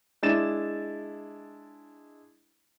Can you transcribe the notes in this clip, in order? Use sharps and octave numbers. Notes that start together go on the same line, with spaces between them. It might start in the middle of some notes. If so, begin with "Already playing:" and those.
G#3 D4 E4 A6 E7